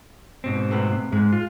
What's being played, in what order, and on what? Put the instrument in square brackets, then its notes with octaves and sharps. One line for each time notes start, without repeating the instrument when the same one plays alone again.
[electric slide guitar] G#2 B2 C4
[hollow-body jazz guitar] C3 A3 B3
[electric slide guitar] G#2 [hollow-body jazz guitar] G#3
[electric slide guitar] F4